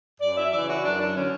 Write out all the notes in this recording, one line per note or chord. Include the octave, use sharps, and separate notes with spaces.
F#2 D5
E5
C#3 E3 D5
F#4
F#2 D4
D4
D3 C#4